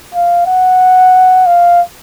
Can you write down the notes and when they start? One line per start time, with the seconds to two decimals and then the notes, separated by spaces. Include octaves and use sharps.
0.14 F5
0.47 F#5
1.46 F5